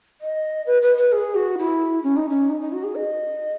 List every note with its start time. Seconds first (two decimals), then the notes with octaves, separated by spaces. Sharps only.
0.21 D#5
0.66 B4
0.82 B4
0.97 B4
1.12 G#4
1.35 F#4
1.58 E4
2.04 C#4
2.17 D#4
2.30 C#4
2.50 D#4
2.61 D#4
2.72 F#4
2.84 G#4
2.95 D#5